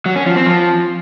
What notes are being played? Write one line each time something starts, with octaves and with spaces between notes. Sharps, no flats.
F#3
C#4
F3
C4
F3